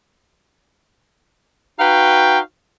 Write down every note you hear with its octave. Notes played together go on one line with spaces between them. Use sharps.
D#4 F#4 B4 F5 G5